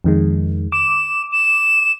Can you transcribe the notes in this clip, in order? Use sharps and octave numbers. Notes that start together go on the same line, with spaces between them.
F2 D#3 G#3
D6 E7
E7